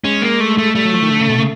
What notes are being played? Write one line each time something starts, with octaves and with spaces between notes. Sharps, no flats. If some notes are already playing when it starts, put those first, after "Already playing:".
G#3 C#4
A#3
A3
A3
G3 A3
F#3
F3
D#3
D3
C#3
B2
C#3